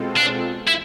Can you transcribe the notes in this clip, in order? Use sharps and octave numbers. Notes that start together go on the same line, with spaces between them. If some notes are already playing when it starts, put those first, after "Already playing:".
Already playing: B2 G#3 C4 F4 A4
D4
E4